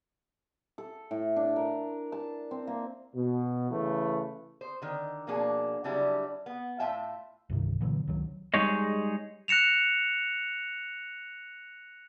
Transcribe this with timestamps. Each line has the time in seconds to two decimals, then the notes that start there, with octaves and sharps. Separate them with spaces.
0.78 A4
1.11 A2
1.36 D4
1.56 A#4
2.12 A5
2.51 C4
2.67 A#3
3.14 B2
3.70 C#3 E3 A3 B4
4.61 C5
4.82 D3 D#3
5.27 B2 F3 A#3 C#4 D4 G#4
5.84 C#3 F#3 G3 D4 E4
6.46 B3
6.79 A2 F4 E5 G5 A5
7.50 C2 G2 C3 D#3
7.80 A#2 D3 E3 F#3
8.07 C#2 D#3 F#3
8.54 G3 G#3 D#4 G#4 C#5 D#5
9.48 F#6 A#6 C#7 E7 F7